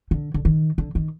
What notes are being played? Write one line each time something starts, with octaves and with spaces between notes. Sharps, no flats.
D3
D3
D#3
D3
D#3